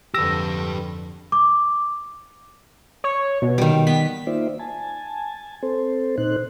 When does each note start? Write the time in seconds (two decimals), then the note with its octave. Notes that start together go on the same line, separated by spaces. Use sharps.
0.14 F2 D3 G4 B4 E6 A#6
1.32 D6
3.04 C#5
3.42 B2
3.58 D#3 G3
3.87 B3 B6
4.27 A#3 D#4 F4 C5 D5 E5
4.59 G#5 A5
5.63 C4 A4 C5
6.18 A#2 D#4 C5 F#6